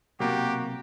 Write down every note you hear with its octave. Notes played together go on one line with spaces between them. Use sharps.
B1 C3 A#3 F#4 G4